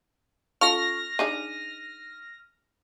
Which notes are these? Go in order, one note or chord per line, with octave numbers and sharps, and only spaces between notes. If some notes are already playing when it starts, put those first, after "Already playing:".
C#4 F4 A4 C#6 F6 A#6
D4 D#4 G#4 D#7